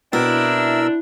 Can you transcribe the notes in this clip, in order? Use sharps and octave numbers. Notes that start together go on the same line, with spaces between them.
B2 C4 D4 E4 A#4 E6